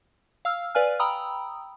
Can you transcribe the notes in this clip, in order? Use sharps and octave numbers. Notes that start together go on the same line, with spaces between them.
F5 E6 F6
B4 D5 F5 G#5 F6
G5 A#5 B5 D#6 E6